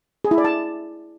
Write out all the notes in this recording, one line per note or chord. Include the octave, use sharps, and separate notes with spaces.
G#4
E4
D5
A5